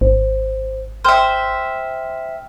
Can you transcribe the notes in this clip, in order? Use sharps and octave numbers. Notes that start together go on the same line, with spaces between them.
G#1 C5
C5 E5 G5 F6